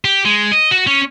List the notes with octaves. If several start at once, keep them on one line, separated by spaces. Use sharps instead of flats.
G4
G#3
D#5
F#4
C#4